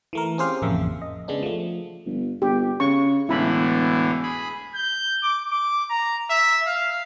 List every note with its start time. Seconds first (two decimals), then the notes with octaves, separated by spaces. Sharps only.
0.13 E3 A3 A#4
0.38 C4 C#4 G4 G#4 C5 F5
0.62 A1 F2 C#3 A#3 E5
1.02 D#5
1.28 C#3 G#3 B3 D4
1.43 F3 A3
2.06 G1
2.42 G1 G4
2.80 C#3 C#6
3.29 E1 A2 D3 E3 E4 B5
4.23 G#4 B5
4.75 G6
5.23 D6
5.51 D6
5.90 A#5
6.30 E5
6.67 F5